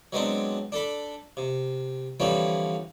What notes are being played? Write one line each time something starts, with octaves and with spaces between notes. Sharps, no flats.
F#3 G#3 B3 C4 D4
D4 A4 B5
C3
D3 E3 F3 G3 C4 C#4